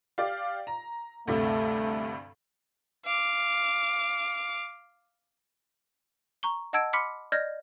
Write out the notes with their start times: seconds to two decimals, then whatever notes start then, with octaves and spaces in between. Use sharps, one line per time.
0.18 G4 D5 F5
0.67 A#5
1.27 D2 G2 C3 A3
3.05 F5 D6
6.43 A#5 C#6 G7
6.73 D#5 F#5 A5 E6 G#6 D7
6.93 B5 C6 D6 F6 B6 C#7
7.32 D5 D#5 F6 G6 G#6 A#6